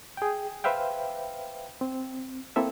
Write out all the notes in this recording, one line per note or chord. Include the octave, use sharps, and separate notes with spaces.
G#4 G5
B4 C5 E5 F5 G5
C4
A#3 C4 E4 A4 E5